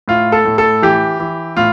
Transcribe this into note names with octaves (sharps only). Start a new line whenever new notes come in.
A2 F4
A4
A2
A4
E3 G4
E3
A2 F4